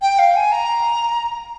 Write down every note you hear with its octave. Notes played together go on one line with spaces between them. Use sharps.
G5
F5
G#5
A#5